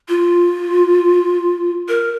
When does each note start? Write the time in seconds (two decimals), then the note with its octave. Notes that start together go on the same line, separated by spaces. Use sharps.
0.09 F4
1.89 A#4